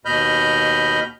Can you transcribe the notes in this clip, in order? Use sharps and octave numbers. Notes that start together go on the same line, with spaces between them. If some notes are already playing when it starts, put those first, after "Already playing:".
D#2 B2 D#5 B5 F6 G6